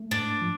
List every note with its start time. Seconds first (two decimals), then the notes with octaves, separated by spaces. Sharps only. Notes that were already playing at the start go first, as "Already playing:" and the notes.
Already playing: A3
0.11 G#2 D4
0.41 F3